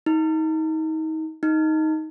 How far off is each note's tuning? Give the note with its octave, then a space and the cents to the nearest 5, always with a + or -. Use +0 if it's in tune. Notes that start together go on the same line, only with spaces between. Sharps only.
D#4 +30
D#4 +10